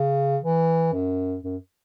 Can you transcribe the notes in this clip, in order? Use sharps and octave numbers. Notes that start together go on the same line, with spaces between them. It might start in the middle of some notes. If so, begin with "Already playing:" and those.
Already playing: C#3
E3
F#2
F#2